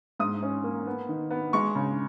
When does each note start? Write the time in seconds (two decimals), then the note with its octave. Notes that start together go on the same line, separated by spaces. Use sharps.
0.20 G#2 D#6
0.42 C#4
0.64 A#3
0.87 B3
1.09 D#3
1.30 B3
1.53 G#3 C#6
1.75 C#3